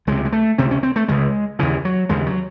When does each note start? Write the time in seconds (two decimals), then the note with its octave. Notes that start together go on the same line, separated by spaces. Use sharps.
0.07 C#2 C3 G#3
0.25 G#3
0.32 A3
0.58 C#2 C3 C4
0.71 C#4
0.83 C4
0.96 A3
1.08 C#2 C#3 G#3
1.59 D#2 C#3 E3
1.85 F#3
2.09 D#2 C#3 G#3
2.27 F#3